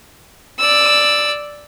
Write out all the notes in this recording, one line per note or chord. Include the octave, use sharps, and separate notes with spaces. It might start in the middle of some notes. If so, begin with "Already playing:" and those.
D5 E6